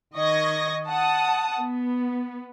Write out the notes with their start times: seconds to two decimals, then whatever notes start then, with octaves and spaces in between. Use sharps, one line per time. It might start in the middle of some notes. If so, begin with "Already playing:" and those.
0.17 D#3 D#5 C#6 G#6 A#6
0.87 F#5 A5 D#6
1.58 B3